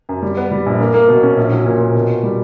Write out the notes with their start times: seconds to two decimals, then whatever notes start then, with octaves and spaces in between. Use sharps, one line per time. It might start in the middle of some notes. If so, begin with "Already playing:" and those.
0.09 F#2
0.22 G3
0.37 B3
0.51 G3
0.66 A#1
0.80 A#3
0.94 A#3
1.08 B2
1.23 C#4
1.37 A#1
1.52 F#3
1.66 A#2
1.80 A#2
1.95 B2
2.10 B3
2.23 G3